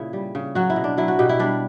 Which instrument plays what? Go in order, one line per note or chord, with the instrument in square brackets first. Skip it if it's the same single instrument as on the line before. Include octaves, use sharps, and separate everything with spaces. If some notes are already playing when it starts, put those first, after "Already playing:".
Already playing: [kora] A#2 C#3 E4
G3
C#3
F#3 F#4
E4
B2
D4
F#3 E4
F#4
B2 G4
E4
G3 D4